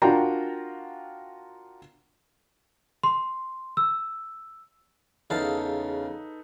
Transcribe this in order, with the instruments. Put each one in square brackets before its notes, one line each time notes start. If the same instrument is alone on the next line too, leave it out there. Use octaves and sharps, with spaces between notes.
[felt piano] D4 F4 F#4 A#4 G5 A#5
[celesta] C6
E6
[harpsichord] E2 F5 A5 [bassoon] C#3 [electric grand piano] D#4 A4 B4